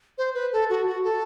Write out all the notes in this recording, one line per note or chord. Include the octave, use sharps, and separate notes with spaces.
C5
B4
A4
F#4
F#4
A4